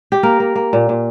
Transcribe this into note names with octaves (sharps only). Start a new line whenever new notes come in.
G4
A#3 A#4
A#3
A#3
A#2
A#2